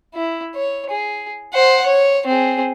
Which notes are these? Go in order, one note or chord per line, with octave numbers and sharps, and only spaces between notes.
E4
C#5
G#4
C5 F#5
C#5
C4 G#4